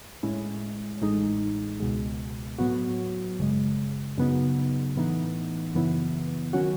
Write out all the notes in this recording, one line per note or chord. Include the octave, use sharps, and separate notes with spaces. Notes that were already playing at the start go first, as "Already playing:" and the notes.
A2 G#3 C#4 E4
A1 A2 G#3 D#4
C#2 B2 G#3
A2 F#3 B3 F#4
G#1 F#2 C#3 G#3
F#2 C#3 F#3 B3 D#4
A2 E3 B3 D#4
F#2 C#3 E3 B3 E4
D#3 F#3 C#4 F#4